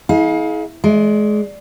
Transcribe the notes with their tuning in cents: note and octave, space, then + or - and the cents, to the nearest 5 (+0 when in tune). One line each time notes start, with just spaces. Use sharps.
E4 -40 G#4 +35 F5 +30
G#3 +25 D5 +0